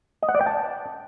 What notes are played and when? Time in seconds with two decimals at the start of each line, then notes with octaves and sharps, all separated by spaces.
0.22 D#5
0.29 F#5
0.35 D5
0.41 G5
0.47 A5